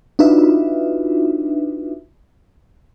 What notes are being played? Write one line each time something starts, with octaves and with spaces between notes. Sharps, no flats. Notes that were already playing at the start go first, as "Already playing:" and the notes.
D4 D#4 F4 F#4 B4 E5